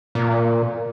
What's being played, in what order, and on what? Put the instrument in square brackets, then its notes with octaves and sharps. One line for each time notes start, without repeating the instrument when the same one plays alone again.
[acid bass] A#2